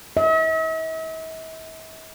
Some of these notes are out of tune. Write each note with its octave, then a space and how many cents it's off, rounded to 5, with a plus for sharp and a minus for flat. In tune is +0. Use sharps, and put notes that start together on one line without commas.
E5 -45